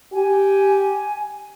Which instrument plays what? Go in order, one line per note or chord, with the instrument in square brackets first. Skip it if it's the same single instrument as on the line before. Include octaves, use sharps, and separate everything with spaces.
[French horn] G4 [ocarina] G#5